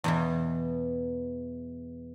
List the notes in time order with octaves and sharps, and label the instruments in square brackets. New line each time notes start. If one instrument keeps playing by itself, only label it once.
[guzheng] E2 B2 E3